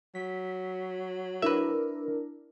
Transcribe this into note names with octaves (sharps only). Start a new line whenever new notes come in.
F#3 B6
D4 E4 A#4 B4 E5